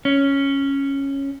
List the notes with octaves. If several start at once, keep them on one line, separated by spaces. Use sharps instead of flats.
C#4